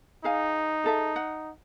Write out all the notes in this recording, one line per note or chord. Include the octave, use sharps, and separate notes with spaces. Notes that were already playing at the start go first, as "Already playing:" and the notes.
D#4 G#4 F5 G#5
G#4 A4 E5
F#5